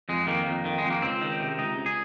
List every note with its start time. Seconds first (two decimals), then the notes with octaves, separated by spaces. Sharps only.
0.09 F2 G#3
0.27 D#3 A#3
0.46 F2
0.65 D#3
0.78 G#3
0.84 F2
0.90 A#3
1.02 C#2 C4
1.21 D#3
1.40 C3
1.58 C#2 D#4
1.78 C#2
1.86 G#4